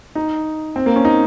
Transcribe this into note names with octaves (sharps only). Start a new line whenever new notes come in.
D#4
C4
A#3
C#4
D#4